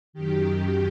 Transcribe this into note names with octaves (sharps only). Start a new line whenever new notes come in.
F#2 D#3 G4